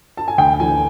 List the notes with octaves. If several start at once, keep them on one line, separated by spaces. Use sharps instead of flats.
A5
G#5
D2 G5
E3 G#5